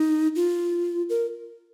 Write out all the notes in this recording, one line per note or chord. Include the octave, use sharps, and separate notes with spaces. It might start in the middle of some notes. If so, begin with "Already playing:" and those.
Already playing: D#4
F4
A#4